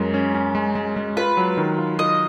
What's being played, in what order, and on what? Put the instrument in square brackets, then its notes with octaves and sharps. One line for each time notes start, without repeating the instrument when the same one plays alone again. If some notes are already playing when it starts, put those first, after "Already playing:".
Already playing: [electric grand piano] F#2 G#3 C#4 [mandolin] A#4
[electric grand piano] C#4
C#4
G#3
G#3
G#3
[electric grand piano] F4 [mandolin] B4
[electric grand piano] F#3
D#3
F4
[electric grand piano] F4 [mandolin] D#5